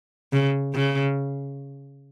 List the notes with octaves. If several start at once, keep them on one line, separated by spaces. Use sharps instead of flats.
C#3
C#3